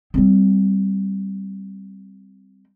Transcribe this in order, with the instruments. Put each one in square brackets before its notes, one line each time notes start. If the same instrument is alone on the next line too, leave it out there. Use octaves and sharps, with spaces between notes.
[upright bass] G3 C4